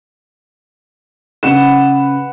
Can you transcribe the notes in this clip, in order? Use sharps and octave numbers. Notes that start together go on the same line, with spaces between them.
C#3 B4 F#5 E7